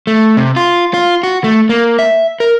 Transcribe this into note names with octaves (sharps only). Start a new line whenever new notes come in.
A3
C3
F4
F4
F#4
A3
A#3
E5
A#4